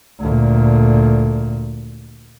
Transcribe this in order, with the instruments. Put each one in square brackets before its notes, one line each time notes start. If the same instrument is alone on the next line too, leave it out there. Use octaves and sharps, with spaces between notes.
[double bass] D2 A#2